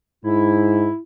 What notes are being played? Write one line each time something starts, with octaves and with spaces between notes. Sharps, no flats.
G#2 E4